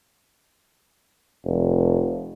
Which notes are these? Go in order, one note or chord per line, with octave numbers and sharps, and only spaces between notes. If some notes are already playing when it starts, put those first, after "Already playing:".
F1